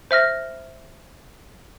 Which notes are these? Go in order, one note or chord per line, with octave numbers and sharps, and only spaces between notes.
C5 E5 F6 A#6